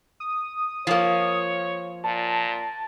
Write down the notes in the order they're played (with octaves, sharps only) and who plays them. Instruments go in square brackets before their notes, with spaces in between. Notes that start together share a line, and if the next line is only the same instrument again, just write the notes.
[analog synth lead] D#6
[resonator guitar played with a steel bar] F3 A#3 [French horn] C#5
[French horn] A#2 [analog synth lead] A5